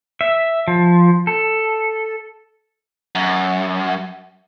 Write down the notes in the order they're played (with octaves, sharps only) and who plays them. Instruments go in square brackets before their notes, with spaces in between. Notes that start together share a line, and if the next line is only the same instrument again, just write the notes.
[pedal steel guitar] E5
F3
A4
[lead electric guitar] F#2